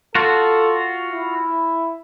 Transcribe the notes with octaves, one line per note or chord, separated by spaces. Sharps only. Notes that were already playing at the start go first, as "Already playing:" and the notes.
F4 F#4 A4
E4